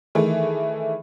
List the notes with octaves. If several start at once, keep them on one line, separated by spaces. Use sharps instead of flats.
D#3 E3 A3 G#4